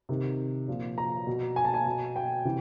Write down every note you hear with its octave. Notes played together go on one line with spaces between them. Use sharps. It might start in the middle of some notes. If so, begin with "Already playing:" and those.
C3 D#3
A#2 F3
A#5
B2
G#5
A5
G#5
B2
G5
C3 E3